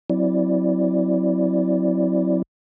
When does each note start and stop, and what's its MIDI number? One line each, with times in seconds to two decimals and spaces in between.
0.10 2.42 54
0.10 2.42 60
0.10 2.42 64
0.10 2.42 74